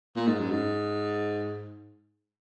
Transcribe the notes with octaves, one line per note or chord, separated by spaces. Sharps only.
A#2
G#2
F#2
G#2